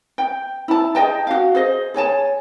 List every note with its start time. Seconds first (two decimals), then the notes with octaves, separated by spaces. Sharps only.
0.18 G5
0.68 E4 A5
0.95 G#4 D#5 G5 A5
1.27 F#4 F5
1.55 G#4 C5 D#5
1.94 G#4 C#5 G#5 A5